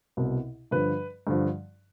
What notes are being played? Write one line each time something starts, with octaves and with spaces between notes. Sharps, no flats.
C2 B2
G2 D3 F3 B4
G2 D3 F3